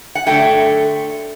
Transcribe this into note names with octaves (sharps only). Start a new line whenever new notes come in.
F#5
D3 F#3 A3 G5